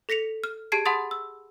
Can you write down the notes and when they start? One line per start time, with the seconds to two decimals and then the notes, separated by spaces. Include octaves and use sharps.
0.09 A4 A#6 B6 C#7 F7
0.44 F6
0.72 G4 G#4 A5 G#6 C7 D7
0.85 F#5 A5 B5 C6 D#6 A6
1.11 E6